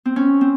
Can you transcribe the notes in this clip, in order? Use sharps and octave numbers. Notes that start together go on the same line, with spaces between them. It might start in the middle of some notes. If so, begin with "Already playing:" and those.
C4
C#4
C4